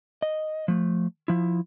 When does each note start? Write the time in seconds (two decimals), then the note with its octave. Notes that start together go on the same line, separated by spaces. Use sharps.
0.22 D#5
0.68 F3 A3
1.28 F3 E4